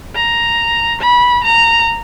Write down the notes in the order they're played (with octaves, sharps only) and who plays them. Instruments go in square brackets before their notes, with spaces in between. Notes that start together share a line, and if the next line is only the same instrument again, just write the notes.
[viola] A#5
B5
A#5